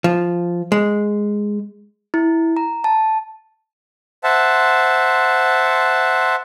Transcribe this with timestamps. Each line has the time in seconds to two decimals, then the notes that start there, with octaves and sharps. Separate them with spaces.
0.04 F3
0.72 G#3
2.14 E4
2.57 A#5
2.84 A5
4.24 C5 E5 F#5 A5